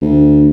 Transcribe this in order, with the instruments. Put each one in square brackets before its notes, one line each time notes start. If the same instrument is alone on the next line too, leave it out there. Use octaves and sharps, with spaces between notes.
[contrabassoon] D2